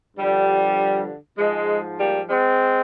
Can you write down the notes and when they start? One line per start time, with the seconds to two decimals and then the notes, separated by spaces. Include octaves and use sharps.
0.17 G2 D3 F3 G3
1.37 G#2 F3 G#3
1.98 G3 A#3
2.28 G#3 C4